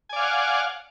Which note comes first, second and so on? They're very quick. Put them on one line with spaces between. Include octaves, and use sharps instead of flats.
G#5 D5 F5 F#5